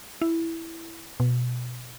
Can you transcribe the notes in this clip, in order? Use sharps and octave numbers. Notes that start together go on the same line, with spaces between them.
E4
B2